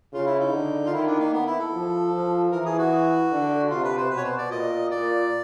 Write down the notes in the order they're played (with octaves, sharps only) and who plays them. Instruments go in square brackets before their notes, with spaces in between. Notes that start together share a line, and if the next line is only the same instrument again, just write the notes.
[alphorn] C#3 [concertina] F4
[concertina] E4
D#4
[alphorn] D3
[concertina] F4
[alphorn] D#3 [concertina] E4
[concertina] D4
A#3
B3
E4
A4
[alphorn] F3
F3
[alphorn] E3 [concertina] A#4
[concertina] G#4
F#4
[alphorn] D3
[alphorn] C3 [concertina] F4
[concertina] B4
C5
[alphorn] B2 [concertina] B4
[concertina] C#5
C5
D5
[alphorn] A#2 [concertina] D#5
[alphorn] A#2 [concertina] D5